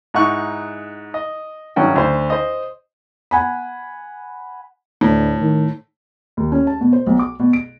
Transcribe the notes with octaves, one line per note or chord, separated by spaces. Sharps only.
G#2 D#4 E4 F#5 C#6 F#6
D#5
G#1 G2 F#3 C#4 F#4 G5
D2 C5
C5 D#5
F#5 G#5 B5
D2 A2
D#3
D#2
C#4
A5
B2
C5
B1
D6
B2
D7